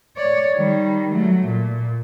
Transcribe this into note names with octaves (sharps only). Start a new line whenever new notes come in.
C#5 D5
D#3 G3
F#3 A3
A#2